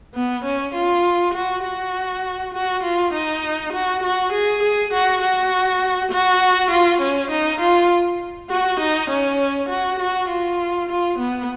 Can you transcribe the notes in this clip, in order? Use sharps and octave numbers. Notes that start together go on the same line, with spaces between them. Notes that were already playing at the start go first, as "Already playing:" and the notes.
B3
C#4
F4
F#4
F#4
F#4
F4
D#4
F#4
F#4
G#4
G#4
F#4
F#4
F#4
F4
C#4
D#4
F4
F#4
D#4
C#4
F#4
F#4
F4
F4
B3